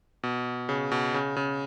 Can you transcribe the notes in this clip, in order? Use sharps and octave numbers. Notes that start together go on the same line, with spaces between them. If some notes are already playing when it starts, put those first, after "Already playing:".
B2
C#3
B2
C#3
C#3